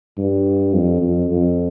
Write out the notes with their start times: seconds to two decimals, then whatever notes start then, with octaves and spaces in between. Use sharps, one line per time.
0.18 G2
0.74 F2
1.02 F2
1.31 F2